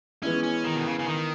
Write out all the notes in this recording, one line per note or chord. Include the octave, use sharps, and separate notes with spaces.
E3 G#3 B3 C#4 E4
C#4
D#3
B2
C#3
C#3
D#3